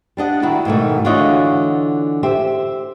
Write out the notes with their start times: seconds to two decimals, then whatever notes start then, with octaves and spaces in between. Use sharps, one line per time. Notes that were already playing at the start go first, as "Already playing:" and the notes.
0.17 G3 D4 D#5 F#5
0.42 D#3 E4 F#4
0.65 G#2 B2 D#3 A3
1.05 D3 E3 F4 F#4 C#5 D#5
2.23 G4 C5 E5